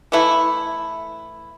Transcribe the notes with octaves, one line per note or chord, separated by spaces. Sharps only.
E3 A3 E4